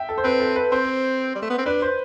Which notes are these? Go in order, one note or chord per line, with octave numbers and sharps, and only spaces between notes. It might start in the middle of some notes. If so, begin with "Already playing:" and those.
Already playing: E5 G5
A4
C5
C4 B4
A4
B4
C4 C5
G3
A3
B3
C4
D4 B4
C5